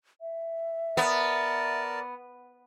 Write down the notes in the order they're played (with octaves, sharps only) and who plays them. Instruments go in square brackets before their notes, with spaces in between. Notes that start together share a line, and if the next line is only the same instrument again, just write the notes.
[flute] E5
[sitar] B3 [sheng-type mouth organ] A#4 D5 A5